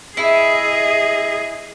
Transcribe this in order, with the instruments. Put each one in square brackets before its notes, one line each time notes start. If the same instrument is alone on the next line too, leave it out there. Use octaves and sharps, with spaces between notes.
[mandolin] E4 [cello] G#4 D#5